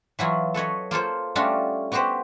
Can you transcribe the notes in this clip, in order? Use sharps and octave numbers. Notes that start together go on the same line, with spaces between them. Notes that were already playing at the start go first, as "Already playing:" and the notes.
E3 F#3 E4 F4
A4 B4 C#5 D#5
A#3 F4 A4 C5
G3 A3 C#4 D4 F4 F#4
B3 F#4 G4 B4 C5